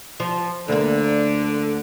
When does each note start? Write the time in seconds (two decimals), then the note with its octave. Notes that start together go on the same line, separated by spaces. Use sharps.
0.20 F3
0.68 D2 D3 A#3